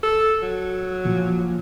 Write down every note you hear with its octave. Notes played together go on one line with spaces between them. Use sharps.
A4
F#3
A#2 F3